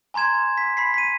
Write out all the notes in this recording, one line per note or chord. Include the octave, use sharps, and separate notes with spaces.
G#5 A#5 C6 G#6 E7
B6
B5 B6 C7
B6 D#7